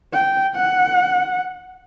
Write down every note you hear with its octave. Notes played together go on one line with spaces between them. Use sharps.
G5
F#5